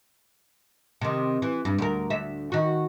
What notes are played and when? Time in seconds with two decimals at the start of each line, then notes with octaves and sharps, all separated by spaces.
1.01 C3 D#3
1.42 E3
1.65 G2
1.78 D2 A#4
2.10 D2 E5
2.52 D#3 F#4